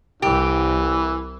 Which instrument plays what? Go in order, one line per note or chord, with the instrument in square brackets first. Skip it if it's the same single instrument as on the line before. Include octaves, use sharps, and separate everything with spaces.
[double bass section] C2 [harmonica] E3 [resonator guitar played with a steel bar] G4